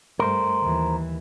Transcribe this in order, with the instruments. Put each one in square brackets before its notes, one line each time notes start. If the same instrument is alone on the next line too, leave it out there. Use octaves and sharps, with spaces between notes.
[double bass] G2 A3 [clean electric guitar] A#4 C5
[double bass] D#2 E3